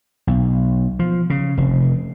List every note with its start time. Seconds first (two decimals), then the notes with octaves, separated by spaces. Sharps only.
0.27 B1
0.99 F3
1.30 C#3
1.57 F1